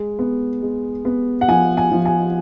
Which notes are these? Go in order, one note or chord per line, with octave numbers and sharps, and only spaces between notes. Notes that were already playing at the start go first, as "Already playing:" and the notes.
Already playing: G#3
B3
G#3
B3
F#5
F3 G#5
G#5
F3
G#5